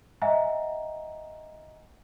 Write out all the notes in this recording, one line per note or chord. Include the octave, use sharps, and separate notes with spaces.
D#5 E5 F#5 G#5 A#5